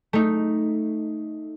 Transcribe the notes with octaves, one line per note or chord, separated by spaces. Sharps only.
A3 D#4